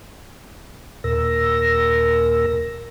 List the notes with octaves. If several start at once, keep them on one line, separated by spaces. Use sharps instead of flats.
D#2 A#2 A#4 E6 A#6